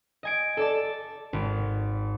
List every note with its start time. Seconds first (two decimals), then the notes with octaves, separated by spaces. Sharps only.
0.23 D#5 G#5 D7
0.57 A4 D5 A5
1.33 G#1